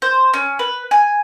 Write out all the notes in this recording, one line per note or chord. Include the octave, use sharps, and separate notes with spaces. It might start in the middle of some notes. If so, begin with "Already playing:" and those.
C5
C#4
B4
G#5